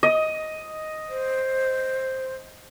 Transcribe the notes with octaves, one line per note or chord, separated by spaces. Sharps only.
D#5
C5